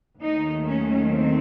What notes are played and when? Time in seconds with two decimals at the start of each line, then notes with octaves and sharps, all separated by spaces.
0.20 D#2 D#3 F#3 A3 D#4
0.66 C#4
1.10 C4